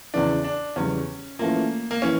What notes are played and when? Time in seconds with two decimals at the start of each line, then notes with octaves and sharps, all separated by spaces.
0.14 E2 C#3 E3 D4
0.44 D4
0.76 E2 C#3 G3 C#4
1.39 E3 A3 A#3 C#4 F4
1.91 A#3
2.02 E3 C#4